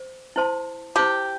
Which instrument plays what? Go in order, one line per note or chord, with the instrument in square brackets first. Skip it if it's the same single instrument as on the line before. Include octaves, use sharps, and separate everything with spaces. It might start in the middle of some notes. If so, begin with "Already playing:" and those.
Already playing: [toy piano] C5
E4 C5 A5 C6
[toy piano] E4 C5 A5 C6 [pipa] G4